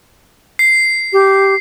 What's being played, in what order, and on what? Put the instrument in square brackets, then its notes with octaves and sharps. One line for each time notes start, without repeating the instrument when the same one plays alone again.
[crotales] C7
[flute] G4